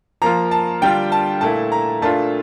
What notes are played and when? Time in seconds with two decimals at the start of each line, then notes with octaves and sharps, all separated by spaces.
0.22 F3 A#3 F4 A#5
0.51 A5
0.81 D3 G3 D4 F4 G5
1.12 A5
1.41 A#2 A3 E4 A5
1.72 A#5
2.01 A#2 A3 D4 F4 A5